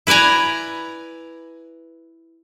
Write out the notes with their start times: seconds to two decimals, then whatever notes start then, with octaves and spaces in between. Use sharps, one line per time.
0.07 E4 B4 D5 G#5 A#5